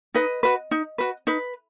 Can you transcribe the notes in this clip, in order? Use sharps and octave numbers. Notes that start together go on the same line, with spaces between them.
D#4 B4 D#5
F#4 B4
D#4
F#4 B4
D#4 B4